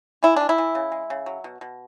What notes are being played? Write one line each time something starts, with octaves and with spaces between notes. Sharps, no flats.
E3 E4
E3 D4
E4
E3
C#3
G#3
C#3
F#3
B2
B2